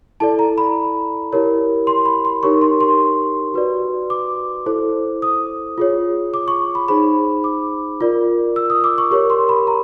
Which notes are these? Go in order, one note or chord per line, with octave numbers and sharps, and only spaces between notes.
E4 A4 D5 A5
A#5
B5
E4 G4 A#4 C#5
C6
B5
C6
D#4 G4 A#4 C#5 C#6
C6
C6
F#4 B4 D5
D6
E4 A4 C5
D#6
F4 G#4 C#5
D6
C#6
B5
D#4 G#4 C5 B5
D6
F4 A#4 D5
E6
D#6
D6
C#6
G4 A#4 C#5 C#6
C6
B5
A#5